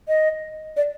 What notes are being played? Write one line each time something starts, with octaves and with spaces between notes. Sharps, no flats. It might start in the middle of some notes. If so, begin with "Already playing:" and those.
D#5
D5